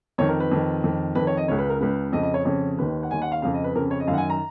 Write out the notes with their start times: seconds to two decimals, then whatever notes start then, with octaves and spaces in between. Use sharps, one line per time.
0.18 F2 D#3 C#5
0.29 A#4
0.40 B4
0.51 F2 D#3
0.84 F2 D#3
1.15 F2 D#3 B4
1.27 C#5
1.37 D#5
1.48 C#2 C#3 C#5
1.58 B4
1.69 A#4
1.80 C#2 C#3 B4
2.12 F2 C#3 D#5
2.23 D#5
2.34 C#5
2.45 F2 C#3 C#5
2.78 D#2 D#3 B4
3.03 F#5
3.11 D#2 D#3 G#5
3.22 F#5
3.32 F5
3.42 F2 C#3 F5
3.54 D#5
3.64 B4
3.75 F2 A#4
3.79 C#3
3.91 C#5
4.00 D#5
4.07 F#2 F5
4.11 D#3 F#5
4.18 G#5
4.30 A#5